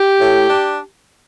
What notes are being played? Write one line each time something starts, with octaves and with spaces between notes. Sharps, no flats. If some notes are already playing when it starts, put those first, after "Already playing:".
Already playing: G4
A2
D4